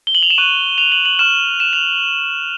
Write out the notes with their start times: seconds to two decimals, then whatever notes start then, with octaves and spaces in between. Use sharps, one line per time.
0.07 G7
0.15 F#7
0.23 F7
0.30 E7
0.38 C#6 F#6 D#7
0.78 F7
0.92 F#7
1.05 F#7
1.19 C#6 F6 E7
1.60 E7
1.73 F7